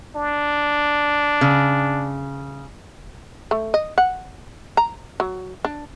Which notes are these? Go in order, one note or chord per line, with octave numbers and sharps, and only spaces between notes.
D4
C#3
A3
D#5
F#5
A#5
F#3
D4